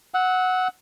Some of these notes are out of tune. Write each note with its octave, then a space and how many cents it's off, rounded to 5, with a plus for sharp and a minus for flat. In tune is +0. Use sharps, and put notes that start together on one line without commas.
F#5 +0 E6 -30